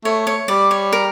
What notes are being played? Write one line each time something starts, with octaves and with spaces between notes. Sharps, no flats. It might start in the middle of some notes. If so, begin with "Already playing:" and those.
A3 C#5
C#5
G3 D5
C#5
A#4